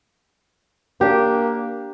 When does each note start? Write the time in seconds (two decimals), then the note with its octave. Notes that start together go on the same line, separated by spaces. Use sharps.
1.01 A#3 D4 G4